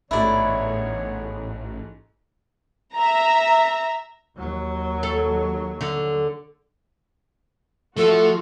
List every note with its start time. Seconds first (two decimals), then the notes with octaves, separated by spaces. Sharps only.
0.11 A1 G#2 D3 A3 B3 E4 C#5 D5
2.95 E5 A#5
4.37 D#2 F#3
5.03 A4
5.81 D3
7.97 F3 A3 F4 F#4 A4